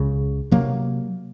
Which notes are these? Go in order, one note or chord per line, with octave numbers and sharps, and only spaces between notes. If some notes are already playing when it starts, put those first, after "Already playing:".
Already playing: C#2 C#3
C3 F#3 A#3